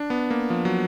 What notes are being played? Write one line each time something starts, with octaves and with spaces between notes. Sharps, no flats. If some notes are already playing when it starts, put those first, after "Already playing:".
Already playing: D4
B3
A#3
F3
F#3